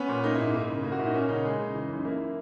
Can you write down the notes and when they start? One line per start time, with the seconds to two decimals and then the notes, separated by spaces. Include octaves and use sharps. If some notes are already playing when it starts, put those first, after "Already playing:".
Already playing: B3 C#4
0.09 A#2
0.24 A#3 D#4
0.35 E4
0.38 G#2
0.44 D#4
0.54 A#3
0.69 C#3
0.84 A#3
0.92 F#4
0.99 A#2 E4
1.06 D#4
1.14 A#3 C#4
1.28 C#3 D#4
1.45 G#3
1.59 C#3
1.74 E3
1.89 F#2
1.97 D#4
2.05 A#3 E4